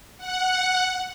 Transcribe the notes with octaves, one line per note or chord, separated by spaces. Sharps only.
F#5